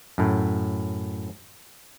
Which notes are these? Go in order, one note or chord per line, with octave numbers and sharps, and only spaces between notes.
F#2 A2